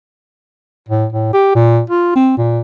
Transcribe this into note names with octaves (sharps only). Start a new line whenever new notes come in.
A2
A2
G4
A#2
F4
C4
A#2